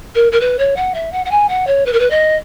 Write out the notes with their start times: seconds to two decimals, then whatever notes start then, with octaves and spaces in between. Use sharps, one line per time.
0.15 A#4
0.32 A#4
0.40 B4
0.59 C#5
0.76 F#5
0.94 E5
1.12 F#5
1.25 F#5
1.31 G#5
1.49 F#5
1.67 C#5
1.86 B4
1.93 A#4
1.99 B4
2.10 D#5